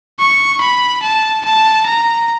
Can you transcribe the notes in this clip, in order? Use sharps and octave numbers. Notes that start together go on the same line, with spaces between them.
C#6
B5
A5
A5
A#5